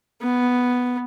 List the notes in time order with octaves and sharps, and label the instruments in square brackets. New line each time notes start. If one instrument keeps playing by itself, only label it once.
[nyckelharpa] B3